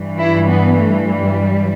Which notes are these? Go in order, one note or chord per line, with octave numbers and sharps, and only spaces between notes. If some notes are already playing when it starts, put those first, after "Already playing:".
Already playing: G2 E3 G3
E4
B3
A3
G3